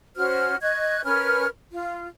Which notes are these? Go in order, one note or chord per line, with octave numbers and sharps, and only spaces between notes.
C#4 F#4 C5 F6
D#5 C#6 F#6 G#6
C#4 A#4 B4 F6
F4